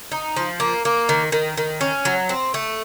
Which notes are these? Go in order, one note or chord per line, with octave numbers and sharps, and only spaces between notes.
D#4
F3
A#3
A#3
D#3
D#3
D#3
C#4
F#3
C4
A3